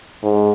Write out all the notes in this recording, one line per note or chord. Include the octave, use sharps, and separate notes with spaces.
G#2